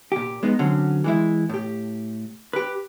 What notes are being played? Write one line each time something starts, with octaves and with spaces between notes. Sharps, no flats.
A#2 G4
G#3 B3 D#4
D3 F#3 C4 C#4
E3 G#3 E4
A2 G4
G4 B4